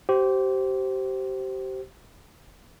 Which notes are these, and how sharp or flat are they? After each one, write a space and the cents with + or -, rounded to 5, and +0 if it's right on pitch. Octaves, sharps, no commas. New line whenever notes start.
G4 -30 C5 +0